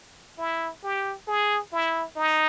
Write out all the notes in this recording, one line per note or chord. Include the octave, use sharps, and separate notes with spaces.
E4
G4
G#4
E4
D#4